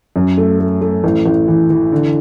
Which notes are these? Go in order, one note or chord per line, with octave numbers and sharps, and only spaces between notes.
F#2
A3
A3
A3
A1
A1
E3
E3
D3